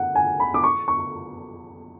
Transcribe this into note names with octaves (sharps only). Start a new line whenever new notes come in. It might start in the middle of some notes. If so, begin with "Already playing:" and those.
Already playing: F#5
G#5
B5
D6
C#6
C#6